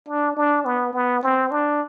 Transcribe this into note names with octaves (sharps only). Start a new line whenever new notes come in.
D4
D4
B3
B3
C4
D4